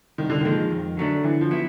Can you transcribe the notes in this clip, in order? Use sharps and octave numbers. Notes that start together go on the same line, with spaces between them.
C2 D#3
D3
A#2 D#3 F3 G#3
F2
D3 F#3 A3 D4
D3 E3
F3
F#3 B3 E4